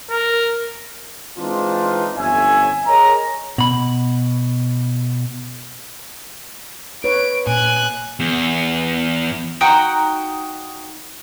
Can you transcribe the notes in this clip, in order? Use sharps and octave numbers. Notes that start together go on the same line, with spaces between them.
A#4
E3 G#3 C4 D4 D#4 F4
G1 F2 C#4 C#5 E5 G#5
G#4 A#4 C#5 D#5 A#5
B2 B5
B4 C#5 D7
A#2 G#5 F#6
E2
D#4 F#4 G5 A#5